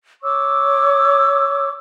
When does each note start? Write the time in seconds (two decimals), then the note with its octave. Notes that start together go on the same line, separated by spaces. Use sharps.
0.23 C#5 C#6 D6 E6